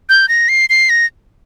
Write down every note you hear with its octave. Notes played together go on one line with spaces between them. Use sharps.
G6
A#6
C7
C7
A#6